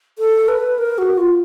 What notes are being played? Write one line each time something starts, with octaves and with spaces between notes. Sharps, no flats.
A4
B4
A#4
F#4
F4